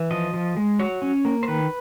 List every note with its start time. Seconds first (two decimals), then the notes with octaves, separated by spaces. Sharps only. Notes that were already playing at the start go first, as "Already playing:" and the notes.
Already playing: E3
0.11 F3 D#5
0.34 F3
0.57 G#3
0.79 F#3 C#5
1.02 C#4
1.25 A#3
1.43 C5
1.48 D#3 B4